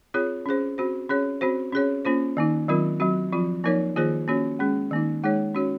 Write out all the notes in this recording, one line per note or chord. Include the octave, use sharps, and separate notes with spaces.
C4 F4 G#4 C#5
C#4 G#4 C5
C4 F#4 C5
C#4 G#4 C#5
C4 F#4 C5
C#4 G#4 C#5
A#3 C#4 F4 C5
D#3 A#3 D#4
D#3 F#3 C4 F4 A#4
F#3 C4 F#4
F3 C4 F4
F3 A#3 D#4 A#4 C#5
D#3 A#3 F4 G#4 C5
A#3 C#4 F#4 C#5
G#3 C#4 G#4
D#3 A#3 D#4
G#3 D#4 G#4 C#5
C#4 F#4 C#5